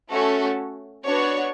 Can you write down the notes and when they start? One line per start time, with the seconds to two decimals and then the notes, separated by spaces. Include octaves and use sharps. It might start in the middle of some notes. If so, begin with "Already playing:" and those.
0.11 A3 C#4 F#4 A4
1.07 B3 D4 F#4 C#5